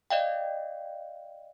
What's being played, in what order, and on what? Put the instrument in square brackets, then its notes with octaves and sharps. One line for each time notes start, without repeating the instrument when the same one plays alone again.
[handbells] D5 D#5 F5 G5